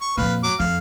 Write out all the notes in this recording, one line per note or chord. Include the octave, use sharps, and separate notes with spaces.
C#6
F2 A#2 B4 F5
F#3 D6
F2 F5